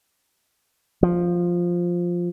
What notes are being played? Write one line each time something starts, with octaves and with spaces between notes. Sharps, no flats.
F3